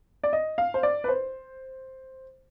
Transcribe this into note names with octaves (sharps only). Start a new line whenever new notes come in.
D5
D#5
F5
C5
D5
B4
C5